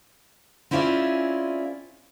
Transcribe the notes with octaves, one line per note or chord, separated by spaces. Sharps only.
C4 C#4 E4 F4 G#4 D5